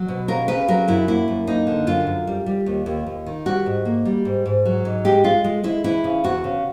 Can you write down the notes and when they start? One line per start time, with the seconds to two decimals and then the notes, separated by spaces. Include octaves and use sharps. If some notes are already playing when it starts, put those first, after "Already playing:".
Already playing: F#3
0.08 B2
0.28 C#3 A#4
0.48 C#3 B4
0.68 F#3 A#4
0.88 F#2 E4
1.08 A#3 E4
1.28 F#2
1.47 A#3 D#4
1.67 D3
1.87 F#2 F4
2.07 F#2
2.27 G3
2.46 G3
2.66 D#2
2.86 D#2
3.06 D#2
3.26 D#3
3.46 G3 F#4
3.66 G#2
3.85 A#3
4.05 G3
4.25 G#2
4.46 G#2
4.65 F#3
4.85 G#2
5.05 G#3 G4
5.24 G#3 F4
5.44 G#3
5.64 G#3 E4
5.84 E3 E4
6.04 C#3
6.24 E2 F#4
6.44 C#3